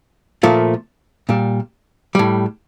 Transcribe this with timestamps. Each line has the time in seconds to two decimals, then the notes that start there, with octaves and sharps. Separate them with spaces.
0.43 A#2 F3 A3
1.29 A#2 G3
2.15 A2 G3